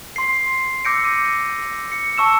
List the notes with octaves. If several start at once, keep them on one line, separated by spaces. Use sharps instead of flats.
C6 C7
D6 E6 G6 A#6 C#7 D7
D#7
C#7
A5 C#6 E6 E7